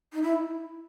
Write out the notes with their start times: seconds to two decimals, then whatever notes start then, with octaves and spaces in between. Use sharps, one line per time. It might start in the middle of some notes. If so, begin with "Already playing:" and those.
0.13 D#4
0.23 E4